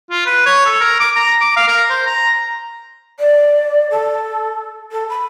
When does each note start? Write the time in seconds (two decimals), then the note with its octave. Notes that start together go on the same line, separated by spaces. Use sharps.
0.11 F4
0.26 B4
0.46 C#5
0.66 A4
0.81 A#4
1.00 D6
1.16 A#5
1.41 D6
1.56 F5
1.68 A#4
1.90 C5
2.07 A#5
3.19 D5
3.91 A4
4.92 A4
5.10 B5